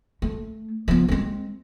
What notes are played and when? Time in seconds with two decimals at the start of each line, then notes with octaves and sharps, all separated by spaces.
0.22 A3
0.88 F3 B3
1.08 G#3 C4